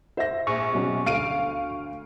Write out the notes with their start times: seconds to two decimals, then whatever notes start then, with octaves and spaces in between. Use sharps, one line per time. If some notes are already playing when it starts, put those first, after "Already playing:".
0.17 C5 E5 A#6
0.47 A#1 C#6
0.72 B2 F#3 C#4
1.06 D2 F5 D7 D#7